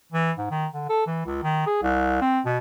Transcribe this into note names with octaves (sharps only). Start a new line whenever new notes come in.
E3
G#2
D#3
D3
A4
E3
C#2
D#3
G#4
C2
C4
B2